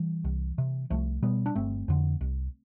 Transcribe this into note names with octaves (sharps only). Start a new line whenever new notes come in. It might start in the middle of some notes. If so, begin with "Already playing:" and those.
Already playing: E3 G3
C2
C3
C2 F3 A3
B2 G3 B3
D4
G1 A3 C4
F2 D3
C2